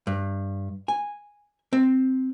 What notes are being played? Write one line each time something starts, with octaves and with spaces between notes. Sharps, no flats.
G2
G#5
C4